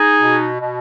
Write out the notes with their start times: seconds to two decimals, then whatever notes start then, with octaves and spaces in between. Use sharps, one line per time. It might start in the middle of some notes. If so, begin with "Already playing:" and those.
Already playing: D#4 G#4
0.21 B2
0.60 B2